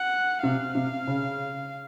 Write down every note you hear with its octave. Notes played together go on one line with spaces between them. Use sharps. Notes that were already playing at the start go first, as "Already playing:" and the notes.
Already playing: F#5
C3 F5
C3
C#3